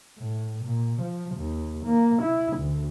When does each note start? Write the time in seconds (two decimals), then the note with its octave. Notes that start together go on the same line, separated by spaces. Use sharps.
0.19 A2
0.64 A#2
1.02 F3
1.36 D#2
1.86 A#3
2.22 E4
2.57 D2